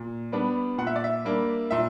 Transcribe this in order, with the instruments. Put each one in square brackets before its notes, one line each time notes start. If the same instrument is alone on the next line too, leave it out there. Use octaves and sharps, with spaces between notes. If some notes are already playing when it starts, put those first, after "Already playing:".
Already playing: [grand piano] A#2
G3 B3 D4
A#2 F#5
E5
D5
E5
G3 A#3 D4
A#2 E5